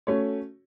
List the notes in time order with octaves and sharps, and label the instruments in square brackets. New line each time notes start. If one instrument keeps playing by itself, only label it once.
[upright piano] A3 C#4 F#4 C#5